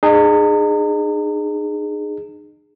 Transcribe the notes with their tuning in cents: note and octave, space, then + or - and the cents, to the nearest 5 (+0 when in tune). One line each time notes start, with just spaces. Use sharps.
D#4 -40 G#4 +0